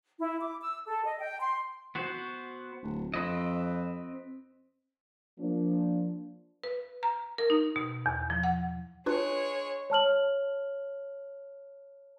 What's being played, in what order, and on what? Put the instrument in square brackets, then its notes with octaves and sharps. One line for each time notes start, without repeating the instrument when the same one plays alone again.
[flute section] E4
D6
E6
A4
D#5
G5
C6
[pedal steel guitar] B3 F#4 C5
[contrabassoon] D1
[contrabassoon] F2 [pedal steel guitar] C4 B4 D#5
[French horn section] F3 A#3 D4
[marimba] B4
A#5
A#4
D#4
B2
E2
F3
F#5
[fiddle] G#3 C#5 [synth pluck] D4 F4 B4
[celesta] C#5 A5 F6 F#7